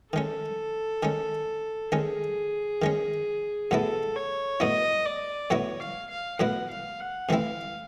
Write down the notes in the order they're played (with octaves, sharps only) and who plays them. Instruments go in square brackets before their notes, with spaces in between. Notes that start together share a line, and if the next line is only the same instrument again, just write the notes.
[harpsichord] D#3 G#3 C#4 [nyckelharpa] A4
[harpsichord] D#3 G#3 C#4
[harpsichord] D#3 G#3 C#4 [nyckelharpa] G#4
[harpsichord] D#3 G#3 C#4
[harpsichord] A2 F#3 B3 E4 [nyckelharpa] A4
[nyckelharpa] C#5
[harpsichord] A2 F#3 B3 E4 [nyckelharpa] D#5
[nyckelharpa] D5
[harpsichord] A2 F#3 B3 E4 [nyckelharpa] C#5
[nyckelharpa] F5
F5
[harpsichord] A2 F#3 B3 E4 [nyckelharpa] F#5
[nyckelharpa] F5
F#5
[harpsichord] C3 E3 A3 C4 E4 [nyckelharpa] F5